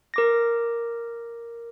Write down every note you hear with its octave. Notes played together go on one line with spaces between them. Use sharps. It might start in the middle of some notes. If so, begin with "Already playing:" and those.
A#4 D6 A#6